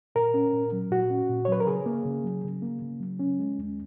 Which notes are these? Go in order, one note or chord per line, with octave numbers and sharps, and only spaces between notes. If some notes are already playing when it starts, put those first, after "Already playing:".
A#2 A#4
C#4
A#2
F#3
A#2 F#4
C#4
A#2
C#5
F#3 B4
A#4
C#3 G#4
A#3
C#3
F#3
C#3
A#3
C#3
F#3
C#4
G#3
D#2